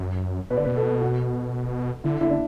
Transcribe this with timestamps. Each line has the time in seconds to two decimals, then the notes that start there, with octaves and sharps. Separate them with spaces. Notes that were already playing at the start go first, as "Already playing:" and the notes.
Already playing: F#2
0.50 B2 B4
0.57 D3 D5
0.64 B2 B4
0.76 A4
1.01 F#4
2.04 D3 E4
2.21 D3 E4
2.30 D4